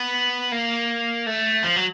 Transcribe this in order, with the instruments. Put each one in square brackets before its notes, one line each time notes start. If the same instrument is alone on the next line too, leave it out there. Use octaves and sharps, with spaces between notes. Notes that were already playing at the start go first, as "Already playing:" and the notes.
Already playing: [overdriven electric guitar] B3
A#3
A3
F3
F#3